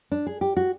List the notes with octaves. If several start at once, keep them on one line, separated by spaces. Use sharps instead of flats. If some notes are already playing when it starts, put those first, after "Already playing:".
D4
G#4
G4
F#4